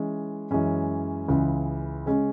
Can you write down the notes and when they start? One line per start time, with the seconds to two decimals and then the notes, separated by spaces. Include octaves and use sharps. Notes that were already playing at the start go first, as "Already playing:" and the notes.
Already playing: E3 G#3 C#4
0.51 F#2 E3 G#3 C#4
1.28 C#2 C#3 E3
2.06 C#3 G#3 C#4 G#4